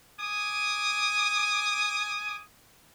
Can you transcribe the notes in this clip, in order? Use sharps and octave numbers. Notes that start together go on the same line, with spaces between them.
G#5 D6 D#6